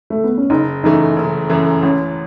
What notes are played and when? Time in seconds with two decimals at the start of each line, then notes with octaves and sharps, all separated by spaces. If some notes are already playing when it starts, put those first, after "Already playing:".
0.10 A3
0.24 B3
0.37 C#4
0.50 F#1 D#4
0.83 F#2 E3 A3 D#4
1.17 F#1
1.50 F#2 E3 A3
1.82 A1 C#4